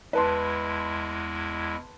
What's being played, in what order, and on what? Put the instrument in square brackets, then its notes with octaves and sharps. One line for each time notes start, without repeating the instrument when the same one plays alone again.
[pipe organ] E2 G#3 E4 [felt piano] B4 A5 C6